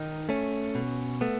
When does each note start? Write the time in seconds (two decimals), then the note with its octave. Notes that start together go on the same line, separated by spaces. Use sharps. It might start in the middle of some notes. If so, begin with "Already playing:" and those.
Already playing: D#3 D#4
0.29 A3 C#4
0.75 B2
1.21 A3 B3